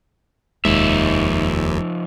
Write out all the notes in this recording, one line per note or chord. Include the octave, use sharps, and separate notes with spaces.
F1 D#2 F3 G#3 D#4 E5